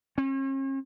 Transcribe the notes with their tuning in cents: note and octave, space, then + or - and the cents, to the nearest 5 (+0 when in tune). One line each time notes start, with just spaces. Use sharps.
C#4 -45